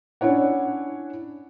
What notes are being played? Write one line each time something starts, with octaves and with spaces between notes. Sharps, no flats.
C#4 D4 E4 C#5 F#5